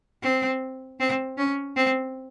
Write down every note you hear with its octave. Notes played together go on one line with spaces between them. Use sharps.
C4
C4
C#4
C4